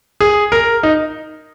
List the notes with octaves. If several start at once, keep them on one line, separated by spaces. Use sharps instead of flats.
G#4
A#4
D#4